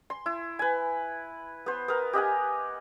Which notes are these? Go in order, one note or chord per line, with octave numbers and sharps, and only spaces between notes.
C6
E4
B4 G#5
B3 C5
B3 A#4
G4 D#5 F#5 G#5